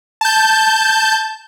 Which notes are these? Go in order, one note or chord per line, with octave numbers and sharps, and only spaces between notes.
A5 G6